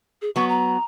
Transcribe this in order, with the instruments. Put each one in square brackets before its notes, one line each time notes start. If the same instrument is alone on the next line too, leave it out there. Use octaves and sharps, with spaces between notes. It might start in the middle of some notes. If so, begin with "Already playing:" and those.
[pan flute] G#4
[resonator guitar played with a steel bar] F#3 B3 [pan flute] C#6
[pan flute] A#5